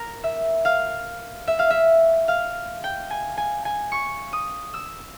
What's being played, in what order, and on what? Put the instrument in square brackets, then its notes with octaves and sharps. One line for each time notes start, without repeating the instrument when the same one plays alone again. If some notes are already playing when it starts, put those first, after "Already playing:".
Already playing: [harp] A#4
E5
F5
E5
F5
E5
F5
G5
G#5
G#5
G#5
C#6
D#6
E6